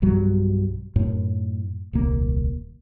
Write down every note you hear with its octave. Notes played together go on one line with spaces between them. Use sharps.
B1 G2 F#3 G3
F#2 A2
D#1 C2 A#3